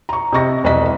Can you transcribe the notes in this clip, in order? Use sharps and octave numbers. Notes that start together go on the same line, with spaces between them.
A#5 C#6
C3 D#5 C#6 A#6
E1 C2 D#5 E5 B6